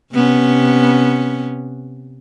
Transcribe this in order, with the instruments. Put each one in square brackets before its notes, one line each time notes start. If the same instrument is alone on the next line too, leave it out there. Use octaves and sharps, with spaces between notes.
[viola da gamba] C3 B3 C#4